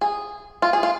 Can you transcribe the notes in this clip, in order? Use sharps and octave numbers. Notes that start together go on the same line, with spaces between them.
G#4
F4
G#4
F4